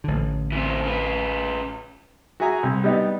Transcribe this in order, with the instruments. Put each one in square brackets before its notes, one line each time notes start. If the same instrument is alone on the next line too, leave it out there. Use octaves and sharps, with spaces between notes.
[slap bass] A1 D3
[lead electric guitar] E3 C4
C#3 B4
[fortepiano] F#4 G#4 E5 G#5 A#5
C2
G3 B3 D#4 G4